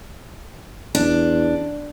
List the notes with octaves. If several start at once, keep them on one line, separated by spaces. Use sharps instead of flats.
E2 D4